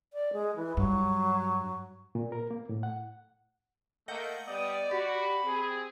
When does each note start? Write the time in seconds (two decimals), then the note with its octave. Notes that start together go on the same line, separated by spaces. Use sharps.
0.13 D5
0.33 G#3
0.56 E3
0.77 G2 F#3
2.15 A#2
2.32 A#4
2.51 A#3
2.69 A2
2.83 F#5
4.08 A3 A#3 D#5 F#5 G6
4.48 G3 B3 D5 D#6
4.91 F#4 G4 B5
5.44 C4 G#4